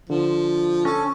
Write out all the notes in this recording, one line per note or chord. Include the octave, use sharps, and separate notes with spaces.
D3 F3
C#4 A4